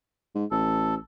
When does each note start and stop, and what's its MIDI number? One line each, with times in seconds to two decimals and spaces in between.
0.35 0.45 44
0.51 0.95 33
0.51 0.95 69